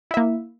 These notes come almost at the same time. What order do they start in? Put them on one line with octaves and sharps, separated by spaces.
E4 E5 A#3